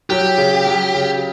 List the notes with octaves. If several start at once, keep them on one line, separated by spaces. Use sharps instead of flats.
F#3 G4
C#3
F#3
C#3